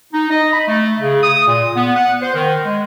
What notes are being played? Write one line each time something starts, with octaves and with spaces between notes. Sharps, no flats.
D#4
D#5
B5
A3
C#3
D#6
A#2
B3
F#5
C5
D#3
G#3